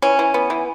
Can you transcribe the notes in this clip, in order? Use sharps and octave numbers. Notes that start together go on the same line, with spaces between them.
E3 C#4
E3
B3
E3